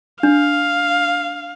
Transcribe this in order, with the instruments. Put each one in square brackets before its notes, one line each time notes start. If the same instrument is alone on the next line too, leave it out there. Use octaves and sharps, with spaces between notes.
[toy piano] D4 [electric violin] F5